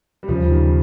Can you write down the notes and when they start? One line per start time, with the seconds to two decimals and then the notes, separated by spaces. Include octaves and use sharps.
0.23 G3
0.28 D#2 C#3 F3
0.51 D#3 G3